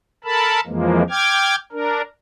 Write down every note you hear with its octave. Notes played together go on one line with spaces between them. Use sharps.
A4 A#4 A5 B5
F2 E3 F3 G#3 A#3
G5 D6 F6 G#6
D4 A#4